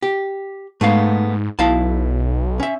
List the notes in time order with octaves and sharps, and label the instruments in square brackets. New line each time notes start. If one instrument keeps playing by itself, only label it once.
[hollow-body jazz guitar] G4
[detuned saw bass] G#2 [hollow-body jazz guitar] A3 B3 F5
[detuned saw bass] B1 [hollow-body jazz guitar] E4 F5 A5
[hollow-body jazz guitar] C#4 E5